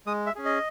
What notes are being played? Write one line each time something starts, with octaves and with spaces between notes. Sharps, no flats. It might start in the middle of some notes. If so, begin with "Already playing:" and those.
G#3 D#6
E5
C#4 G#4
D#5